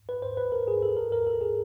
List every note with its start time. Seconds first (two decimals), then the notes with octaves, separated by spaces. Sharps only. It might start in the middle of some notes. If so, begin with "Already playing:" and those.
0.09 B4
0.22 C5
0.37 B4
0.52 A#4
0.68 G#4
0.82 A4
0.97 A#4
1.12 A#4
1.27 A4
1.41 G#4